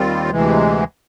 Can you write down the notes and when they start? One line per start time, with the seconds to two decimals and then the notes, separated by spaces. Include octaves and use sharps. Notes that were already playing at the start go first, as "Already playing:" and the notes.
Already playing: D#2 D#3 G3 C4 F4
0.30 D2 C3 E3 G#3